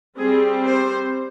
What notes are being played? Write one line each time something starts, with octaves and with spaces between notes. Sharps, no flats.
G3 C4 G#4
C5